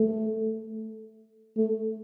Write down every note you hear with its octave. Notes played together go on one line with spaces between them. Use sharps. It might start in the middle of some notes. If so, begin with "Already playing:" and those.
Already playing: A3
A3